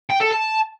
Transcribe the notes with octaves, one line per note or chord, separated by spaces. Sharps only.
G5
A4
A5